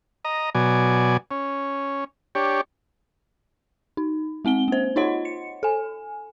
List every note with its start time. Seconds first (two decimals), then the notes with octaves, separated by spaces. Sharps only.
0.25 D#5 A#5
0.55 B2 F#3 D5 G#5
1.31 C#4
2.35 D4 G4 C#5
3.97 D#4
4.45 G#3 C4 F#5 G7
4.68 A#3 C5
4.96 D#4 F4 C#5 D#5 F#5 C6
5.25 C#7
5.63 A4 G#5